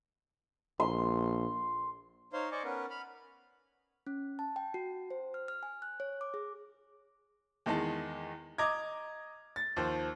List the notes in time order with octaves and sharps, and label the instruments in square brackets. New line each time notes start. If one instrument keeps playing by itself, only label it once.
[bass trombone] A#1 [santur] C6
[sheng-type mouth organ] D#4 C5 C#5 F5 C6
C5 D5 D#5 G#5 C#6 D6
B3 C#4 A#4 B4
B5 F6
[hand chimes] C#4
A5
G5
F#4
C5
F6
F6
G#5
F#6
C#5
D6
G#4
[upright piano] E2 D#3 G#3 A5
D#5 A#5 D6 G#6
A6
D#2 F3 C5